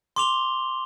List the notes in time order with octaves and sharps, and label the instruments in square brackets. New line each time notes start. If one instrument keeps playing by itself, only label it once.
[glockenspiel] C6 D6 F7 G7